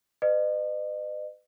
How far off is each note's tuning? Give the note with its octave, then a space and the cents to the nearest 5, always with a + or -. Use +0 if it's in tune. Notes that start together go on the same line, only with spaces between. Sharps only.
B4 +40 D#5 -40